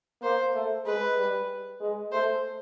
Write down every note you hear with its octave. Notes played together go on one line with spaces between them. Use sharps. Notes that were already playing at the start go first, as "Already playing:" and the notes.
A#3 C5
A3
G#3 B4
G3
G#3
A3 C5